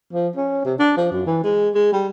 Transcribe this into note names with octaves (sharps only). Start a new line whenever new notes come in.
F3
C#4
C3
D4
F3
F#2
E3
G#3
G#3
G3